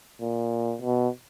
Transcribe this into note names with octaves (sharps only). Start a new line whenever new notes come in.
A#2
B2